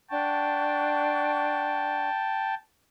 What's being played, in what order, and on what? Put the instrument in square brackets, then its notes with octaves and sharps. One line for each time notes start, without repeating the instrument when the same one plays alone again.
[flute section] D4 F#5 C#6 [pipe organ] G5 A5